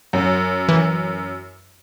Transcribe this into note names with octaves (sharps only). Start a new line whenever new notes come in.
F#2
E3